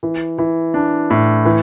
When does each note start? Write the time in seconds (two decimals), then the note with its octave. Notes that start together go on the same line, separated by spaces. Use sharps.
0.03 E3
0.38 E3
0.74 D4
1.10 A2
1.45 E3